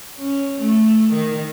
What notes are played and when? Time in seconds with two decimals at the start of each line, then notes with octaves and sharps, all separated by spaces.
0.18 C#4
0.61 A3
1.13 D#3